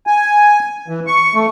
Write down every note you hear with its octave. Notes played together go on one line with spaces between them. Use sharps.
G#5
E3
C#6
A3